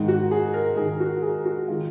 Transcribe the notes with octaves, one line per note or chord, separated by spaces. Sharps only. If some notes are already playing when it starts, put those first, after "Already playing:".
Already playing: G#2 D#3 G#3
F#4
G#4
A#4
G#2 D#3 G#3 G#4
F#4
G#4
F#4
D#3 G#3 F4